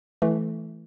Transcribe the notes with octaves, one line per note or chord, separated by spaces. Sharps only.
E3 A3